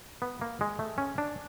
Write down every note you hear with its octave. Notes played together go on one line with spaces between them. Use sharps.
B3
A#3
G#3
A3
C#4
D4